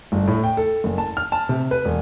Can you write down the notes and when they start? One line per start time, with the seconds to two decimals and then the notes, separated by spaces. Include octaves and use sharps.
0.12 G1
0.28 A2
0.44 G5
0.57 A4
0.84 F#1
0.98 A5
1.17 F6
1.32 A5
1.49 C3
1.71 B4
1.85 E1